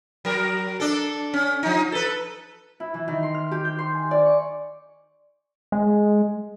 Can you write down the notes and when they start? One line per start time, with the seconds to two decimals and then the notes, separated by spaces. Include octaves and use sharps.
0.25 F#3 A#4
0.80 D4 A4
1.34 C#4
1.63 F3 D#4
1.92 A4 B4
2.80 E4
2.94 E3
3.08 D#3
3.23 C6
3.34 F6
3.51 G4
3.65 G6
3.78 C6
3.94 G#5
4.11 D5
4.25 C#6
5.72 G#3